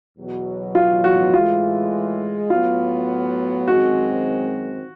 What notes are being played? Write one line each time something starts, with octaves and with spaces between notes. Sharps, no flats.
E2 B2 F#3
F4
F#4
A2 E3 G#3 F4
A2 F#3 B3 F4
F#2 D#3 G#3 C4 F#4